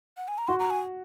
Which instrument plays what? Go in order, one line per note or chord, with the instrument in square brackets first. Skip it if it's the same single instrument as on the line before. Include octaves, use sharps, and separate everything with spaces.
[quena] F#5
G#5
A#5
[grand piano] F#4 [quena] C6
[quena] A#5
G#5